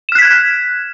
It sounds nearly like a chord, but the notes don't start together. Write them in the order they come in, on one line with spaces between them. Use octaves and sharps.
E7 F6 F#6 B6 G#6